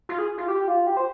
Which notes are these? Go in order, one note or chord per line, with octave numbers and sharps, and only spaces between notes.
F4
G#4
F4
G4
F4
G4
C5